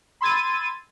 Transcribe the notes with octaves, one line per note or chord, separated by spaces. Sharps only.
B5 C6 E6 G#6 A6 D#7